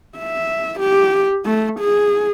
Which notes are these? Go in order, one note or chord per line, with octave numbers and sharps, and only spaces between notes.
E5
G4
A3
G#4